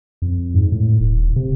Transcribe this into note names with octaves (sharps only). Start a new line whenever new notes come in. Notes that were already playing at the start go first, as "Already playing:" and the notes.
F2
G#2
A2
D#1
C3